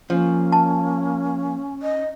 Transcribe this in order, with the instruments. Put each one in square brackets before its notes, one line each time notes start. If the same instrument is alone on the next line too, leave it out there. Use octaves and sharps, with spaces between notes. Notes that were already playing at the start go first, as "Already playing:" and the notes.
[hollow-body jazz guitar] F3 [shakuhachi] A#3 [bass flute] C#4
[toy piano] A5
[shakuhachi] D#5